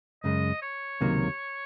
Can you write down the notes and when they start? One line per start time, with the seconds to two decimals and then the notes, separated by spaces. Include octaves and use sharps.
0.23 F#2 C#3 G#3 D#5
0.62 C#5
1.01 C#2 C3 D#3 F#3 A#3